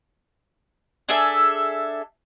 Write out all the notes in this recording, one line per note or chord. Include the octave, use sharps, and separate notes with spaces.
D4 G#4 A4 E5